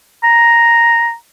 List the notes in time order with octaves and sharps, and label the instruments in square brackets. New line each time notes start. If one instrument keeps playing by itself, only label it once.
[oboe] A#5